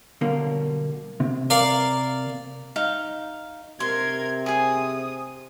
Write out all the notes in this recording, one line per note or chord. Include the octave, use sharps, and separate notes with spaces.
B1 B2 D3 G3 A#3
C3
A#4 D5 F5
D#4 F5
C3 A#4 C6 G#6
G#4 G#5 D#6